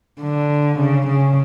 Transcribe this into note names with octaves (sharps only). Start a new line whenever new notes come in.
D3
C#3
C#3